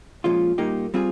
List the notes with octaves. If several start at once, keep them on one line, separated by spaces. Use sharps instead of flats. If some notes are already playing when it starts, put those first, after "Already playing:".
A#2 F3 G#3 C#4 F4
A#2 G3 A#3 D#4 G4
G3 C4 F4 G#4